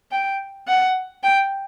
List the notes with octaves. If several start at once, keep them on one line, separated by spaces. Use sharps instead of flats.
G5
F#5
G5